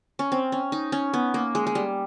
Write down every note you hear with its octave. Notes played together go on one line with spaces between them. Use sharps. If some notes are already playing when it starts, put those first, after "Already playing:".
C#4
C4
C#4
D#4
C#4
B3
A#3
G#3
G#3
G3